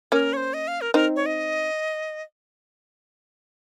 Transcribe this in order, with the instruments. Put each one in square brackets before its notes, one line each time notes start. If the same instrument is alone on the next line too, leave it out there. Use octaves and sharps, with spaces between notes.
[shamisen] A#3 C#4 [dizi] A#4
[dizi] C#5
C5
D#5
F5
A#4
[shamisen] C4 D#4 [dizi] A#4
[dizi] C#5
D#5